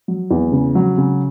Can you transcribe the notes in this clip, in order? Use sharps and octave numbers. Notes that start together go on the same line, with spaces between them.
F#3
E2
C#3
F#3
C#3